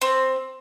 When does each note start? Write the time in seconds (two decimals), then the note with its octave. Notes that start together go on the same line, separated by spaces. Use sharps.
0.02 C4